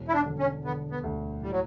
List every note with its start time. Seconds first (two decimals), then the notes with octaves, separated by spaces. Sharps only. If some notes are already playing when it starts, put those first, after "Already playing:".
Already playing: E1
0.08 E4
0.13 D4
0.26 D3
0.39 C#4
0.65 D3 B3
0.91 B3
1.03 D2
1.42 A2 G3
1.51 F#3